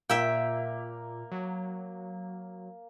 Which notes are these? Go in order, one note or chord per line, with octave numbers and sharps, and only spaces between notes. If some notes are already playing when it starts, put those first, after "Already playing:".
A#2 A#3 E5 G5
F#3